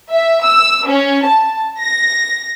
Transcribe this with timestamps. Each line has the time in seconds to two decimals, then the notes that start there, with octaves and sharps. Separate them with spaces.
0.11 E5
0.43 E6
0.87 C#4
1.24 A5
1.80 A#6